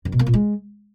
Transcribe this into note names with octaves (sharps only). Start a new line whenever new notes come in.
F#2
B2
A#3
A#2
G#3